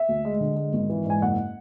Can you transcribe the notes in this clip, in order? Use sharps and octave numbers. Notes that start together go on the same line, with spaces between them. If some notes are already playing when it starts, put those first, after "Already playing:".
Already playing: E5
D2
G#3
D3
G#3
G#1
E3
G#2 G#5
F#1 F#5